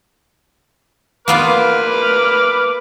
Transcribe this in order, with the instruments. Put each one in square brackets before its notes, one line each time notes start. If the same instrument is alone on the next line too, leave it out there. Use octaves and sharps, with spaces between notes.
[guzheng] A#3 B3 F4 [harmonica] B4 D6 F6